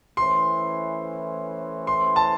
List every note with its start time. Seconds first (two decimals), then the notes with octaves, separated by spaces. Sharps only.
0.17 E3 A3 C#4 E4 C5 C6
1.87 C6
2.16 A5